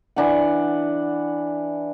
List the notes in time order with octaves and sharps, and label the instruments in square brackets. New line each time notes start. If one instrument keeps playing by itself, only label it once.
[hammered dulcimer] E3 D4 F#5